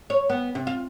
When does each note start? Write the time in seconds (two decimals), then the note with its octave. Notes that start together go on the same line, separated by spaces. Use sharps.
0.10 C#5
0.29 B3
0.55 C3
0.67 F4